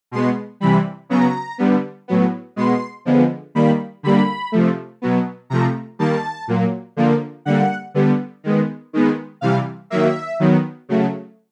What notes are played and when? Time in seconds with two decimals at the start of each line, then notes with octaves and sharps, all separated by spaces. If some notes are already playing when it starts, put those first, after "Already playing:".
0.11 B2 G#3 B3 C6
0.60 C3 E3 G3 B5
1.09 C#3 F#3 B3 A#5
1.58 D3 G3 B3
2.08 A2 F#3 B3
2.56 B2 G#3 B3 C6
3.05 D3 F3 G#3 B3
3.55 D#3 G3 A#3 B5
4.03 D3 G3 A#3 B5
4.52 C3 F3 A3
5.02 B2 F#3 B3
5.50 C3 F3 A3 A#5
5.99 D#3 G3 A#3 A5
6.48 A#2 F#3 A#3
6.96 D3 F3 A#3
7.45 D3 G3 A#3 F#5
7.94 D3 G3 B3
8.44 D#3 G#3 B3
8.93 D#3 G#3 B3
9.41 C3 E3 G3 F5
9.90 D#3 F#3 A#3 E5
10.40 D#3 F#3 B3
10.89 C#3 F#3 A3